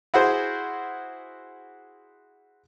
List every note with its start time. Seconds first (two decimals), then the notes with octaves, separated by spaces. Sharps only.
0.14 E4 F#4 G#4 C5